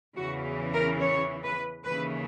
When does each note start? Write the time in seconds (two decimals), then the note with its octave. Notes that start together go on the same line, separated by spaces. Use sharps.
0.17 E2 C#3 E3 F#4
0.73 A#4
1.01 C#5
1.43 B4
1.85 D#2 C#3 E3 B4